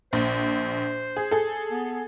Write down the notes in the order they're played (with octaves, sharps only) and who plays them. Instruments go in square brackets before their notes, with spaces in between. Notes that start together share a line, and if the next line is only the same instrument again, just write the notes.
[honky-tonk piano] A#1 [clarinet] C5
[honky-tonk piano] G#4
G#4 A4
[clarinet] B3